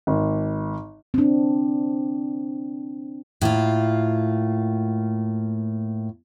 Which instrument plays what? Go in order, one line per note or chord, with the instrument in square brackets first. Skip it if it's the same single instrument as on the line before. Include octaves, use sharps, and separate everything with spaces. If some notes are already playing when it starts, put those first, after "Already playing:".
[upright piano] G#1
[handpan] C4 D4
[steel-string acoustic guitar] A2 A#3 F4